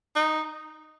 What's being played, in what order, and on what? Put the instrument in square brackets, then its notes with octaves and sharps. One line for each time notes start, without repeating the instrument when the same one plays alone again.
[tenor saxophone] D#4